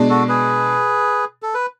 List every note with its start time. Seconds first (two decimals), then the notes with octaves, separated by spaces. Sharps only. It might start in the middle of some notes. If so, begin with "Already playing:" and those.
Already playing: B2 G#3 D4
0.09 F#4 A4
0.29 G#4 B4
1.43 A4
1.54 B4